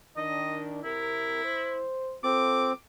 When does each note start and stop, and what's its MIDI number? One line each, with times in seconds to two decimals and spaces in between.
0.17 0.83 51
0.17 0.83 62
0.17 0.61 75
0.84 1.44 48
0.84 1.44 60
0.84 1.87 64
0.84 1.44 70
1.45 2.16 72
2.24 2.73 60
2.24 2.70 65
2.24 2.70 69
2.24 2.72 86